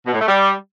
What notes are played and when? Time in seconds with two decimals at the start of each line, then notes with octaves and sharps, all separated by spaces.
0.06 B2
0.13 A2
0.20 A3
0.27 G3